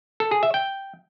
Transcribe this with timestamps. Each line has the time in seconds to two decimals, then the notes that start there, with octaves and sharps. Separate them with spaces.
0.20 A4
0.31 G#4
0.43 E5
0.54 G5